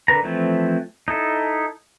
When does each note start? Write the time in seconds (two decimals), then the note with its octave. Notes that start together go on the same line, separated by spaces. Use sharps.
0.08 D3 A#4 B4 A#5
0.24 E3 F3 A3 C4 E4
1.08 D#4 E4 A4